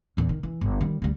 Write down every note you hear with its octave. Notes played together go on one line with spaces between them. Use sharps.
E2 A#2
D#3
E3
G1
D#3 G3
D2 G3